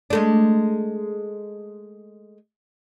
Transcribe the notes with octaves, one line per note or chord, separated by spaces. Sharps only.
G#3 A3 D4